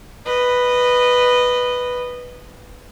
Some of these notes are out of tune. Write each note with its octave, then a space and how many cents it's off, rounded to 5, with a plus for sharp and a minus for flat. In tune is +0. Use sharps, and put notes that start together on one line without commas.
B4 +0 D#5 -20